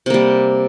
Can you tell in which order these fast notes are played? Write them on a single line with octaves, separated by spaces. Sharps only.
C3 A#3 G3